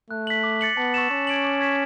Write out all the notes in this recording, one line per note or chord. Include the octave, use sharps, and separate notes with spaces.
A3 F#6
B6 F#7
D6
A6 C#7 F#7
B3 A5
C#6 E6 A6 E7
C#4 C#6
G#6 D7 F#7
D6
G#6 B6 E7